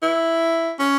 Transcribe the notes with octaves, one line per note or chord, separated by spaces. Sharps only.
E4
C#4